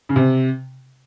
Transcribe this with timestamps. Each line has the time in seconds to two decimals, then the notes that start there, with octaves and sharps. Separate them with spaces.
0.09 C#3
0.16 C3